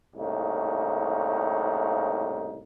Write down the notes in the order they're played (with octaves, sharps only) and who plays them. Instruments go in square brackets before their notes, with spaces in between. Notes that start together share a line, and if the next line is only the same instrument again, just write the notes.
[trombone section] C2 A2 C#3 A#3 D#4